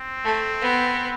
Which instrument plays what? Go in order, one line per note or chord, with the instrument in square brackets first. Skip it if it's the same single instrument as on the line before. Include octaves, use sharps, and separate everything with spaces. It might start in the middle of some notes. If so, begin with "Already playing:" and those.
Already playing: [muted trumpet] C4
[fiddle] A3
B3